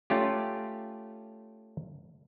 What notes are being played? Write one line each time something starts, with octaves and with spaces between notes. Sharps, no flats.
A3 C#4 F4 G4